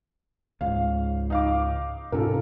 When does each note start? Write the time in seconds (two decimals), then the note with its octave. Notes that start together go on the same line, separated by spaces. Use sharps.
0.61 C#2 G#2 F5
1.30 D#4 F5 D6
2.12 G#2 C3 C#4 F4 A4 A#4